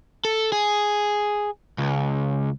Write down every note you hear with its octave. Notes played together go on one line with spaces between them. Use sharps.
A4
G#4
C#2